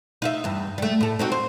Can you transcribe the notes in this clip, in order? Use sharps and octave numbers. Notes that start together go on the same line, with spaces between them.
D#4 F4 E5
E2 G2
G3 A3
A2 A4
C4 D#4 F#4
C5